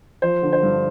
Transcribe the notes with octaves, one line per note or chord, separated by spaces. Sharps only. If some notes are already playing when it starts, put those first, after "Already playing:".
F3 C5
D3
C5
G2